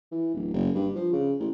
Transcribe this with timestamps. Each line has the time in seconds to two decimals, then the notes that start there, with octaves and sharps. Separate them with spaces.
0.11 E3
0.34 D1
0.53 F#1
0.75 G2
0.95 F3
1.13 C#3
1.40 A1